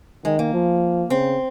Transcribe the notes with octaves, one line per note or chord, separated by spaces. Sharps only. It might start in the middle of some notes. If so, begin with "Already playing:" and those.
D#3 G#3
A#3
F3
C#3 C4